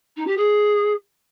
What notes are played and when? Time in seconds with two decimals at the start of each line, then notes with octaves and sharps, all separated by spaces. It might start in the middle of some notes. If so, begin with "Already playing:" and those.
0.16 D#4
0.26 G4
0.37 G#4